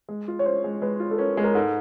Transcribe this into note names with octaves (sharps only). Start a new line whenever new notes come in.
G#3
F4
C#5
C#4 C5
G#3
G#3 B4
F4
A4
C#4 A#4
G#3
A#4
G#2 A4